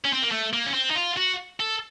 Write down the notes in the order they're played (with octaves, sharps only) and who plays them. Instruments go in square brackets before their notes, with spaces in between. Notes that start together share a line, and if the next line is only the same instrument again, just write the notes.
[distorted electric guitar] C#4
C4
A#3
A3
A#3
C#4
C4
D#4
F4
F#4
A4